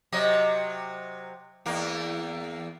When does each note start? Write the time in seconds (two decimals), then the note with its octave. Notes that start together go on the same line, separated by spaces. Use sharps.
0.12 C3 F#3 D#5
1.66 E2 A#3